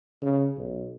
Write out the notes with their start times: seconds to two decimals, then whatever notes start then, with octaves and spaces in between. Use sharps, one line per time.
0.22 C#3
0.57 B1